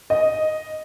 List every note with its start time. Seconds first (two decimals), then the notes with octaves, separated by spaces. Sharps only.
0.10 D#5